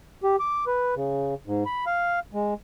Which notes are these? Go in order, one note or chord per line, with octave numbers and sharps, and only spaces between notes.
G4
D6
B4
C#3
G#2
B5
F5
G#3